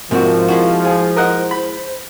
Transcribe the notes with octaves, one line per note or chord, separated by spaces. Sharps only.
G#2 C3 F3 C4 F#4 A#4
G#3 E4 F#4
G#4 C5
A#4 D#5 F#5
B5